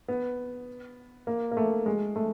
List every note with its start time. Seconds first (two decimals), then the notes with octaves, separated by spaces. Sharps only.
0.08 B3
1.27 A#3
1.51 A#3
1.57 A3
1.86 G#3
2.16 A3